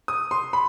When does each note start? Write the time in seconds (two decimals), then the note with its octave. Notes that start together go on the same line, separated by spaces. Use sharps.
0.08 D#6
0.31 C6
0.53 B5